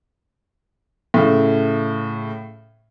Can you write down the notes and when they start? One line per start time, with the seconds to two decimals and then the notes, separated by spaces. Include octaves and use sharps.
1.14 A2 C#3